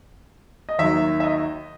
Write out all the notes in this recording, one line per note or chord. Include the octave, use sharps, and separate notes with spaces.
D#5
D#2 D#3 F#3 E5
E5
D#5